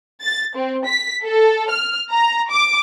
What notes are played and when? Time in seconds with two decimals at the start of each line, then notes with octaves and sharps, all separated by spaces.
0.22 A6
0.55 C4
0.87 B6
1.24 A4
1.70 F6
2.11 A#5
2.50 D6